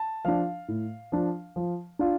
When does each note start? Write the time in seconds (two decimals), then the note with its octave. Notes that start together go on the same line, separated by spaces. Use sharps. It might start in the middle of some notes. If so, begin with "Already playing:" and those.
Already playing: A5
0.25 F3 D4 F5
0.68 A2
1.12 F3 D4
1.56 F3
1.99 D4 F4